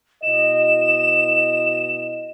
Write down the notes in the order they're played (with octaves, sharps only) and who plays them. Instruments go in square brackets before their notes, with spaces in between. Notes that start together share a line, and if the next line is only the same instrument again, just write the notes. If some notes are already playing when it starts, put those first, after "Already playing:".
[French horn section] B2 E4 D#5 [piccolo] E7